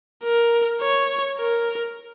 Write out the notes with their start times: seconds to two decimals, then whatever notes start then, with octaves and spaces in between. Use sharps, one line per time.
0.24 A#4
0.81 C#5
1.38 A#4